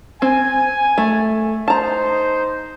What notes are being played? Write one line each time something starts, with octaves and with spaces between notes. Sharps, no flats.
C4 G#5
A3
D#4 C5 A5 A#5